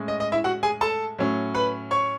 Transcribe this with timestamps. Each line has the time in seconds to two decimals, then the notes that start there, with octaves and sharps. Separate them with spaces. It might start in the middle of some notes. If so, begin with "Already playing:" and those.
Already playing: A2 G#3 C#4
0.08 D#5
0.20 D#5
0.32 E4 E5
0.44 F#4 F#5
0.63 G#4 G#5
0.81 A4 A5
1.18 A2 F#3 C#4
1.54 B4 B5
1.91 C#5 C#6